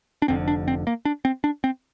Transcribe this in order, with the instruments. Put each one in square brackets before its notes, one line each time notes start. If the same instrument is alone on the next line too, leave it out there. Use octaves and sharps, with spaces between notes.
[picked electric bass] D4
F1 F2 D3 C4
D4
C4
A#3
D4
C4
D4
C4